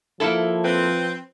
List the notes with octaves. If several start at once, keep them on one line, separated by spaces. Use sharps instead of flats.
F3 A#3 E4 A4
C4 B4